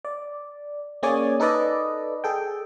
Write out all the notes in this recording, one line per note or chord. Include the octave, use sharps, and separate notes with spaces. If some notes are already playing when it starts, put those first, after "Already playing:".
D5
A#3 C#4 G#4 C#5 D5 G#5
D#4 A4 B4 D5 D#5
G#4 A4 G5